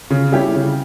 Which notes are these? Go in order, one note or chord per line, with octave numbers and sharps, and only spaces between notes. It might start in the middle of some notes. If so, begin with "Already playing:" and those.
C#3
G3 C#4 E4 G4
C#3